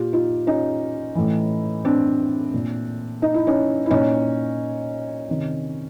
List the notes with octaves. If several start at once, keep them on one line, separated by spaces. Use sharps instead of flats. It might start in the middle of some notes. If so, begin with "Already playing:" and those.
Already playing: A#2 F4 G4
D#4 F4
C#4 D#4
A2 E3
C4 D4
A#2
D#4
E4
C#4 D#4
E4
A#2 C#4 D#4
C3 D#3